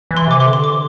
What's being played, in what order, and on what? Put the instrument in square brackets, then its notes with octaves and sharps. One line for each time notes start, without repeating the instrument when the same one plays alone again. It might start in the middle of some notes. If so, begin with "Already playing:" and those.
[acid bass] E3
[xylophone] C6
[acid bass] C3 [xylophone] D6
[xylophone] C6
[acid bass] D3
[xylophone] C6
D6